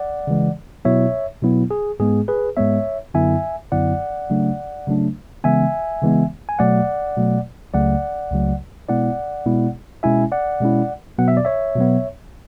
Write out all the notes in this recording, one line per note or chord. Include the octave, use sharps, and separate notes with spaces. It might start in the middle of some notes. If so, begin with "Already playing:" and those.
Already playing: D5 F#5
C#3 E3 G#3
B2 F#3 B3 E4 C#5 E5
B2 F#3 B3 E4
G#4
G#2 G#3 B3 G#4
G#4 B4
G#2 G#3 B3 C#5 E5
F#2 D3 F#3 B3 E4 E5 G#5
F#2 D3 F#3 B3 E4 D5 F#5
C#3 F#3 A3 D4
C#3 F#3 A3 D4
C#3 E3 G#3 B3 E5 G#5
C#3 E3 G#3 B3
G#5
B2 F#3 A3 D5 F#5
B2 F#3 A3
C#2 C#3 F#3 A3 D5 F#5
C#2 C#3 F#3 A3
B2 G#3 B3 E4 D5 F#5
B2 G#3 B3 E4
B2 G#3 C#4 E4 E5 G#5
D5 F#5
B2 G#3 C#4 E4
B2 F#3 B3 F#5
E5
D5
C#5 E5
B2 F#3 B3